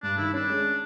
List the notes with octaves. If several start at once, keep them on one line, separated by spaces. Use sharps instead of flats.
G2 D4
D#3 E4
C#4 D4
G#3